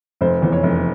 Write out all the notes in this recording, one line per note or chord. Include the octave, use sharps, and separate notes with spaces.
F1 C5
E2
C#5
F1